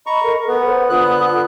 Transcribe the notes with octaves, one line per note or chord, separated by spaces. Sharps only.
D#5 A#5 B5 C#6
A4 A#4
B3 A4 B4
C5 F#5
D3 B3 F4 D#6 F#6
A4